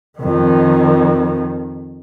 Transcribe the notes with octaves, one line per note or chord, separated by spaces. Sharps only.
F2 D#3